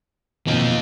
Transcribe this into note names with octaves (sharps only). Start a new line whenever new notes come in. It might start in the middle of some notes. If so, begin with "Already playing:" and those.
F2 B2 A#3 D#4